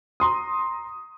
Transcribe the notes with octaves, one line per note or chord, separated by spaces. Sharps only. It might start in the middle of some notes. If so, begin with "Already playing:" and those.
A#5 C6 D#6